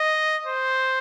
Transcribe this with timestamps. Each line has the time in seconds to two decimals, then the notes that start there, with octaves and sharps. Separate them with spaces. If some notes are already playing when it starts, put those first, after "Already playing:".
Already playing: D#5
0.46 C5